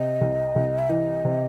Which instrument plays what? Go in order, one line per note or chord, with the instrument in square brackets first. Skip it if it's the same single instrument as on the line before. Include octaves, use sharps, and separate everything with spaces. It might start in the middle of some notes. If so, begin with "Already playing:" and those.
Already playing: [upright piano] C3 [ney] D#5
[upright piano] C2
C2
[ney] E5
[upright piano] E3 [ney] D#5
[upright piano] C3